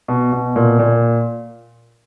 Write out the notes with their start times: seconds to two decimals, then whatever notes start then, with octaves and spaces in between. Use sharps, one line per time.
0.08 B2
0.32 B2
0.56 A#2
0.79 A#2